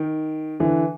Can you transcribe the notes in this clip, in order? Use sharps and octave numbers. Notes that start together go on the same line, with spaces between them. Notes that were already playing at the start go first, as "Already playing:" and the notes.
Already playing: D#3
D3 E3